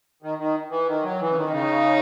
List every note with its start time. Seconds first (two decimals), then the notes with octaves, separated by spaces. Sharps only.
0.23 D#3
0.39 D#3
0.70 E3
0.87 D#3
1.03 F#3
1.20 E3
1.30 C#3
1.36 D#3
1.52 C#3 D#4